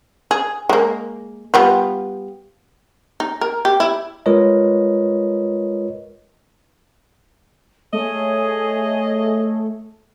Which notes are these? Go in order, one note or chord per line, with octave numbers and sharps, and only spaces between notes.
G#4
G#3 A#3
G3 B3 F4
D#4
A#4
G4
E4
G#3 F4 A#4 B4 C#5 D#5
A3 G#4 C#5 D#5